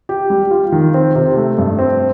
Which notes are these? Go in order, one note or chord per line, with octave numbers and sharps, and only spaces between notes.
G4
G3
F4
D#3
C4
C3
A3
G2
C4